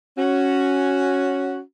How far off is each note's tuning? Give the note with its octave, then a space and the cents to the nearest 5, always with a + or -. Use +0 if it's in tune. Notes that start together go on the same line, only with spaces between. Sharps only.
C#4 +0 F#4 +0